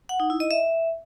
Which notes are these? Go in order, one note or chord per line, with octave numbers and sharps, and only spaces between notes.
F#5
D#4
E4
D#5
E5